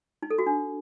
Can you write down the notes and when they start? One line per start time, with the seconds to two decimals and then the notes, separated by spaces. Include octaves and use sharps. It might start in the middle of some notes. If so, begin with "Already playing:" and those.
0.22 D#4
0.30 A4
0.38 F#4
0.46 D4